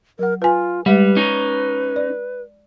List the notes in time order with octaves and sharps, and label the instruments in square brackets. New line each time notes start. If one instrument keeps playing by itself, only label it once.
[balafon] F#3 F#5 [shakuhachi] A#4
[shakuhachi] F4 [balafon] B4 G#5
[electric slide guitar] G3 [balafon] G#3 E5 [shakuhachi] B4
[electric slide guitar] C#4 D#4
[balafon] D5